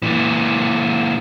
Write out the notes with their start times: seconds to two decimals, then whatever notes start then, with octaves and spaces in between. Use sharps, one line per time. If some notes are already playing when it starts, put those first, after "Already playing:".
0.02 A#2 E3